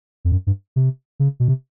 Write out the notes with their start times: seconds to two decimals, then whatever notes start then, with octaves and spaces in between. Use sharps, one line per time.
0.25 F2
0.32 F#2
0.47 G2
0.76 C3
1.20 C#3
1.40 B2
1.48 C3